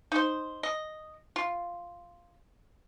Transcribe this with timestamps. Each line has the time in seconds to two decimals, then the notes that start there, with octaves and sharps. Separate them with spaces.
0.12 D#4 C5
0.63 D#5
1.36 F4